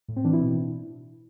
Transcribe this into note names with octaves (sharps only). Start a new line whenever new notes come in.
A2
C4
E3 D4
E4
B2